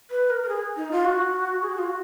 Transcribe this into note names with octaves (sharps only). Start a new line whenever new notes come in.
B4
A#4
A#4
G#4
D#4
F4
F#4
G#4
F#4
F4
F#4